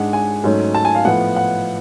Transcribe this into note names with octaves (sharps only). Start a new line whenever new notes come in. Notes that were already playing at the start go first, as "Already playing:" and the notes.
Already playing: G#2 G#3 D4 F#5
G#5
G#2 F#3 A3 C#4
A5
G#5
F5
A2 F3 B3 F#5
F#5